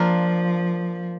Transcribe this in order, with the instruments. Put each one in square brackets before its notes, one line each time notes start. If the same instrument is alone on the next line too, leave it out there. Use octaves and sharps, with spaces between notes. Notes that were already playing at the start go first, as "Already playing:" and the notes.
Already playing: [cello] F3 [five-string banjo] A#3 D4 F4 A#4